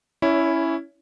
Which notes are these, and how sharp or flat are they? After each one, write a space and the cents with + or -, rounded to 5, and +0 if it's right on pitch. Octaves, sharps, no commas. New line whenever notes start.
C#4 +0 E4 +0 C#5 +25